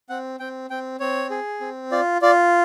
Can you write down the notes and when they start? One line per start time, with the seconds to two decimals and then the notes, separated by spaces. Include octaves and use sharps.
0.09 C4 F#5
0.40 C4 G5
0.70 C4 G5
1.00 C4 C#5
1.30 G#4
1.61 C4
1.92 F4 D5
2.22 F4 D5